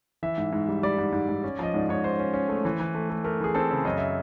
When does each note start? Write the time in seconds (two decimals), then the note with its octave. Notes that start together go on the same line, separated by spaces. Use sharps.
0.23 E3 E5
0.38 G#2
0.53 G#2
0.68 G3
0.83 G3 D5
0.99 G#2
1.13 G#2
1.29 G#2
1.43 C#4
1.59 F3 D#5
1.74 G#2 D5
1.89 G#2 C#5
2.04 C#4 C5
2.19 C#4
2.34 C#4
2.49 A3
2.65 E3
2.80 E3
2.95 A3
3.10 A3
3.24 A3 A#4
3.40 E3 G#4
3.55 C4 A4
3.71 C#3
3.85 F#2 D#5
3.98 E5